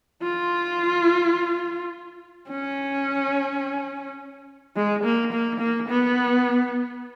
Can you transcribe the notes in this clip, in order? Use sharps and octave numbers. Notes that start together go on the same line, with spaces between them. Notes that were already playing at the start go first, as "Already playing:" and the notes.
F4
C#4
G#3
A#3
A#3
A#3
B3